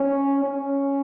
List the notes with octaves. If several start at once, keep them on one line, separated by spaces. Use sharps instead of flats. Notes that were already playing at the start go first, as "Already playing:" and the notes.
Already playing: C#4
C#4